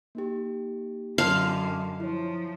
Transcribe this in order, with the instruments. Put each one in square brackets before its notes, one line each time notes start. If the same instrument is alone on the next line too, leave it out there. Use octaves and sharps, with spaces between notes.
[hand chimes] A#3 D#4 G4
[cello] F#2 D3 [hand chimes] D#5 A5 C6 [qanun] F5
[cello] F3 [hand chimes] E4 C#5